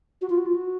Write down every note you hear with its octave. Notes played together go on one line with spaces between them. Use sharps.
F#4
F4
F#4
F4
F#4